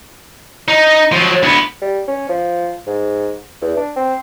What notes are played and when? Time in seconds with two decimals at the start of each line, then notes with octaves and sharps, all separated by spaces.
0.68 D#4
1.12 F3 F#3
1.43 D2 B3
1.82 G3
2.08 C#4
2.29 F3
2.87 G#2
3.61 E2
3.77 D4
3.96 C4